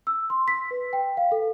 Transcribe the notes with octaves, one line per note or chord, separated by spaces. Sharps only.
E6
C6
B6
B4
G5
F5
A4